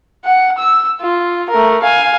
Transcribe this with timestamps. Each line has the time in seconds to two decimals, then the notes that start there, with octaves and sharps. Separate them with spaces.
0.25 F#5
0.58 E6
1.01 F4
1.50 A3 A#4
1.82 F5 G#5